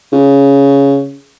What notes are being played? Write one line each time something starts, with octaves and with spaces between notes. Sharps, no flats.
C#3